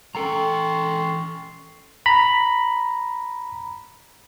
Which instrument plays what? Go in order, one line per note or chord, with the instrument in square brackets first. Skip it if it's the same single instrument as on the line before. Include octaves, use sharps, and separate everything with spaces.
[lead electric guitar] E3 G5 [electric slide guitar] C#4 A4 A#5 [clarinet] C6 [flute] C#6
[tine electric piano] A#5 B5